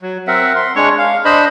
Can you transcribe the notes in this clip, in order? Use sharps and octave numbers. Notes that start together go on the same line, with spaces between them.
F#3
C4 A#4 E5 F#5
C6
G#3 D4 C#5 C#6
F5
D4 C5 D#5 B5